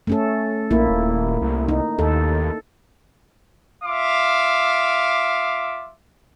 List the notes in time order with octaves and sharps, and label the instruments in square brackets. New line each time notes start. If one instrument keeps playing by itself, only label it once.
[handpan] A3 C#4 A4
[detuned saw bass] A#1 [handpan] A#3 E4
[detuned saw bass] D#1
C2
[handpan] D#4
[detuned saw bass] D#2 [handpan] A4
[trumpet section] F4 E5 F5 D6